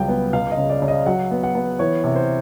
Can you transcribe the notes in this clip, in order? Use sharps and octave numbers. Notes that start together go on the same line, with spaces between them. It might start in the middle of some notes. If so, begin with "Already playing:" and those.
Already playing: C#2 F#3 G3 G5
B3
C#2 F5
D#5
C#3
D5
C#3
D#5
F#3 F#5
B3
F#5
B3
E3 C#5
C3
C5